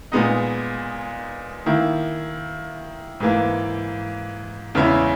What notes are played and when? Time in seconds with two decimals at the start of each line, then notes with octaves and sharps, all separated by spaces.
0.12 A#2 G#3 B3 D#4
1.66 D#3 A#3 E4
3.20 G#2 E3 A#3
4.75 E2 C#3 G#3 C#4 E4